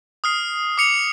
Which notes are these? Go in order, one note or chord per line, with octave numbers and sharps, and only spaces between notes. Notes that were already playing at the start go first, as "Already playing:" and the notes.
D#6 F6 C7
D6 C#7 F7